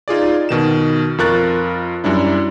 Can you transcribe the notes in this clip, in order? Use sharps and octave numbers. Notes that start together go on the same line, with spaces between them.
D#4 F4 G#4 D5
B2 D#3 E7
F2 F4 A#4 C#6 F#6 A6
F#2 G3 D4 E4